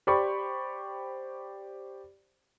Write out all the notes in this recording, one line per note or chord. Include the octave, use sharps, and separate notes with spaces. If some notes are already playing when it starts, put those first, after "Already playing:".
G4 C5 D5 B5 C#6